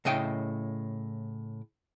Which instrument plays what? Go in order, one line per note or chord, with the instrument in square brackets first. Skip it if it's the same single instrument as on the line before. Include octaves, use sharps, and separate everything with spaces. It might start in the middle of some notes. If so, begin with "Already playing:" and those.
[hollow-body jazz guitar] A2 C#3 D#5 G5